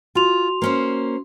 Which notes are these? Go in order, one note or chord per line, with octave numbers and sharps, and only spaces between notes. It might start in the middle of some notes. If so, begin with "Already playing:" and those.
F4 F#4 C6 F7
A#3 C#4 C5